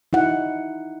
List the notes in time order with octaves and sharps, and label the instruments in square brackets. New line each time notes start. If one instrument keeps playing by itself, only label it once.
[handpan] D#4 E4 F#5